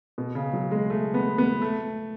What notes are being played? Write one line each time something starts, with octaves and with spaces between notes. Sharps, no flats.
B2
C#3
F#3
G#3
A3
B3
B3
A3